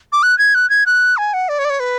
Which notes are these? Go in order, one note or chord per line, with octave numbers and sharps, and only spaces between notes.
D6
F#6
G#6
F#6
G#6
F#6
G#5
F#5
D5
C#5
D5
C#5
B4